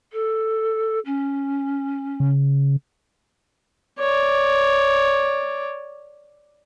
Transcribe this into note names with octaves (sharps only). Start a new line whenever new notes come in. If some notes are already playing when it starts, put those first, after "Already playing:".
A4
C#4
C#3
C#5 D5